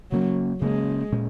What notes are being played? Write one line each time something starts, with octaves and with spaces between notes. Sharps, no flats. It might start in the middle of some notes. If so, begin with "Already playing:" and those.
C#3 F#3 A#3 C#4
C#3 G#3 A#3 C#4
A#2 G#3 C#4